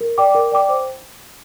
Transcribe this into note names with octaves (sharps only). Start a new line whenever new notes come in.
A#4
D5 G5 D6
A#4
D5 G5 D6
C5